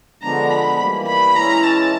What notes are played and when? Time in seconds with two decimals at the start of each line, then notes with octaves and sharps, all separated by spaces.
0.23 D3 F3 G#3 B3 D4 A#5
0.51 B5
0.79 E3 G3 A#3
1.08 B5
1.35 E3 G#3 C#4 E4 A#5
1.64 A5